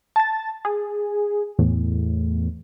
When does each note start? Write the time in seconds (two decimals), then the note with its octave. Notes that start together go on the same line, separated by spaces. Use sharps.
0.16 A5 A6
0.65 G#4
1.59 E2 A2